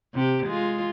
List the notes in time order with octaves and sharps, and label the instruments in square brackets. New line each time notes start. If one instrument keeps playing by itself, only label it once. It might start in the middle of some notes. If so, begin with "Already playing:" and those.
[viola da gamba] C3 G4
G#3 F4